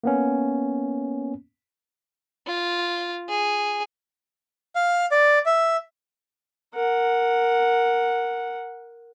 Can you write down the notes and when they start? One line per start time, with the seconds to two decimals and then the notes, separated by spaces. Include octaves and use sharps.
0.04 A#3 B3 C#4
2.47 F4
3.29 G#4
4.75 F5
5.11 D5
5.46 E5
6.74 A#4 F#5